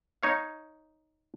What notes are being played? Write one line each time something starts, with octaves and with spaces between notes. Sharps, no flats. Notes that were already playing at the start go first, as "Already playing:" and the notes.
D#4 C#5 F5